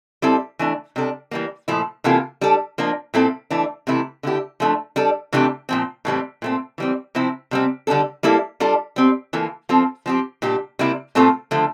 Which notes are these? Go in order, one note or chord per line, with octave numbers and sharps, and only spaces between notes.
G3 C4 E4 A4
E3 A3 D4
C3 G3 D4 A4
E3 G3 A#3
A#2 F3 A3 E4
C3 E3 A#3 F4 A4
G3 D4 A4
F3 A#3 D4
A#2 G3 C4 E4 A4
E3 A3 D4
C3 E3 A3 E4
D3 A3 E4 G4
F3 A3 D4
G3 D4 A4
C3 E3 A3 D4 G4
A#2 F3 C4
A2 E3 G3 C4
A#2 A3 C4
E3 G3 C4
C3 F3 C4 E4
C3 G3 C4
D3 G3 D4 A4
G3 A#3 E4 A4
G3 D4 F4 A4
G3 C4 G4
E3 A#3 F4 A4
F3 C4 F4 A4
F3 C4 G4
A#2 G3 D4 G4
C3 G3 A#3 E4
A#2 A3 C4 F4 A4
D3 F3 A3